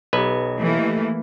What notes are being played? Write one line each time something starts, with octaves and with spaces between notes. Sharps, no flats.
B1 G4 B4 D#5
E3 A3 A#3